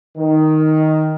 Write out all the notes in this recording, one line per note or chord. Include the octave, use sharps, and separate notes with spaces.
D#3